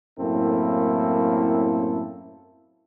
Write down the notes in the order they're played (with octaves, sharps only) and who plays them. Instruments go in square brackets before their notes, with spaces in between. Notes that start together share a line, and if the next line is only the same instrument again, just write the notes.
[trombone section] F#2 A2 A#3 C4 E4 A4